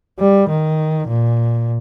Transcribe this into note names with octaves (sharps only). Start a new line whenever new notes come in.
G3
D#3
A#2